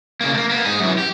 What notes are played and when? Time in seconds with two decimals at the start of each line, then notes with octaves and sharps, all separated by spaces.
0.21 C#3 A#3
0.34 A3 A#3
0.50 A#3 B3
0.65 G#2 G#4
0.80 F#2 E3
0.98 G4